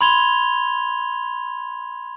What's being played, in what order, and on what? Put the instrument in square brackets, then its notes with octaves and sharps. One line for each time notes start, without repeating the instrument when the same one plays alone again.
[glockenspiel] B5 C6 G#6 F7 G7